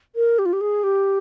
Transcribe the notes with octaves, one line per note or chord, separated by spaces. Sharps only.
A#4
G4
F4
G4
G#4
G4